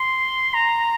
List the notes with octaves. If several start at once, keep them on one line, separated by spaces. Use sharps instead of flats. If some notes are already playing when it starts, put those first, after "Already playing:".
Already playing: C6
A#5